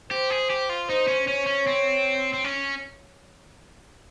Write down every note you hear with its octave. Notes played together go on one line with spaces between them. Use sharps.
G4 C5
G#4
G4
F4
D#4 C5
C#4
C#4 C#5
C#4
C4
C4
C#4